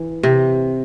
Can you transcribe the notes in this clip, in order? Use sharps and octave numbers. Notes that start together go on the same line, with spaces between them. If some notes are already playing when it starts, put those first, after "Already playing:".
Already playing: E3
C3